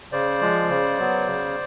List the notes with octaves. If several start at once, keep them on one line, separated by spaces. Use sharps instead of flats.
C#3 C5 D5
F3 G#3
C#3
F#3 B3
C#3